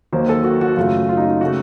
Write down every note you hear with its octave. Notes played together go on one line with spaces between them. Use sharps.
D#2 D#3 F#3 A#3 C5
A4
F#4
F#4
F#2 C#3 F#3 A3 F4
F4
D#4
F4
C#3 A3 F#4